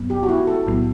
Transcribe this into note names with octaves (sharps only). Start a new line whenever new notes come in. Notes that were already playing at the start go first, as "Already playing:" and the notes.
Already playing: G2 F#3 B3
G4
F#4
E4
A4
B1 A2 F#3 B3 E4